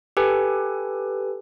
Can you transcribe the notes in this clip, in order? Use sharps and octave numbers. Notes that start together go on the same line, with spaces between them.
G4 A4 B4 G#5